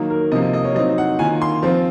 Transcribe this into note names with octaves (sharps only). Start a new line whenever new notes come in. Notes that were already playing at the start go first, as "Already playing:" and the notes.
Already playing: D#3 F#3 A#3 D#4
A#4
C3 F3 A#3 D#5
D#5
D#5
C#5
F#3 C4 D#4 D#5
F#5
D#3 A#3 F4 G#5
C6
F3 C4 F4